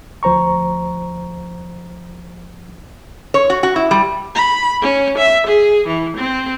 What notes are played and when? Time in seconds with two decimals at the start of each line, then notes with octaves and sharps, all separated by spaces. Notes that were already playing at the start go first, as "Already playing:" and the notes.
0.23 D2 F3 C5 A#5 C#6
3.34 C#5
3.50 F#4
3.63 F#4
3.76 E4
3.91 G3
4.35 B5
4.82 C#4
5.18 E5
5.47 G#4
5.87 E3
6.17 C4